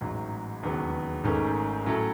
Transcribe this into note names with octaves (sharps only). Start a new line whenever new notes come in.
A1 G#2 F#3
E1 D#2 C#3 F#3 B3
G#1 G#2 D#3 A3 C#4
A2 F#3 C#4 E4 A4